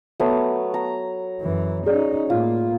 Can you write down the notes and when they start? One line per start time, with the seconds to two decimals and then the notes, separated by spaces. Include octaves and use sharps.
0.20 F#3 A3 B3
0.74 A#5
1.41 F#2 E3
1.86 C#4 D#4 G#4 D5
2.30 A2 A#3 F4